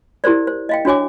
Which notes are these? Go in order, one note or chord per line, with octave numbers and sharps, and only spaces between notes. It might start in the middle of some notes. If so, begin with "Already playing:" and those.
E4 G4 A#4 C5 D5
C5
D#5 F5 G5
D4 F#4 C#5 G#5 D6